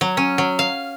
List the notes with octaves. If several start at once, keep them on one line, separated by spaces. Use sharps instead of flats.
F#3
C#4
F#3
F5